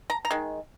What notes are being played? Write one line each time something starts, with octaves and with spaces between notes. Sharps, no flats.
A#5
A#5
D#3 G#3